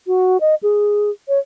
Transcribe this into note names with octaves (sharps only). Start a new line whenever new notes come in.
F#4
D#5
G#4
C#5